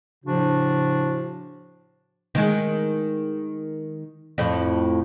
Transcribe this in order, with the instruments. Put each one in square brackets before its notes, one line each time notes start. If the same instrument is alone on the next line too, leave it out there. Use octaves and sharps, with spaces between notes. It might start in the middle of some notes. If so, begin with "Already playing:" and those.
[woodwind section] A2 C#3 F3 D4 F#4
[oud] D#3 G#3
F2 A2